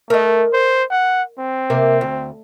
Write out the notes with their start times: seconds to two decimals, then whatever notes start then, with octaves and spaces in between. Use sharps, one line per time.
0.10 A3 A#4 D#5
0.53 C5
0.91 F#5
1.39 C4
1.70 C3 A#3 A#4
2.01 D2